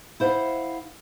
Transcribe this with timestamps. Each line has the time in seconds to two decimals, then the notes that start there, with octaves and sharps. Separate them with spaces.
0.20 E4 C5 F5 F#5